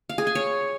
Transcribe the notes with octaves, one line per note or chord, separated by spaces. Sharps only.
F5
G#4
G#5
C#5